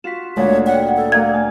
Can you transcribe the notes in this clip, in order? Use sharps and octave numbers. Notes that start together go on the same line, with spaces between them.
F4 F#4 B6 E7
D2 A#2 G#3 C#5
F#5 G5
A4
A3 A#3 D5 F5 G#6
G#5